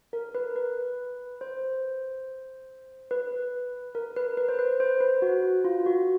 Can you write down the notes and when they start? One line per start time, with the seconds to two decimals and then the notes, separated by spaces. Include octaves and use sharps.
0.13 A#4
0.35 B4
0.56 B4
1.41 C5
3.11 B4
3.95 A#4
4.16 B4
4.37 B4
4.49 C5
4.59 B4
4.80 C5
5.01 B4
5.22 F#4
5.64 F4
5.86 F#4